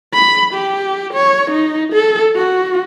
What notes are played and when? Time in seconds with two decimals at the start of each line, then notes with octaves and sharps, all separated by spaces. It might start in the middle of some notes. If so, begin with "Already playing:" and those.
0.14 B5
0.54 G4
1.14 C#5
1.51 D#4
1.93 A4
2.36 F#4